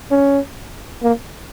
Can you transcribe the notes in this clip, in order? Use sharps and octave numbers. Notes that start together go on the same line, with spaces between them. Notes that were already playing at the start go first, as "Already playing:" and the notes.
C#4
A#3